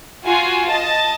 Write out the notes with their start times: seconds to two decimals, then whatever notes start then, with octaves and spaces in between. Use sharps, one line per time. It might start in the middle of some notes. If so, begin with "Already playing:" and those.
0.25 F4 F#4 G#5
0.68 D#5 A5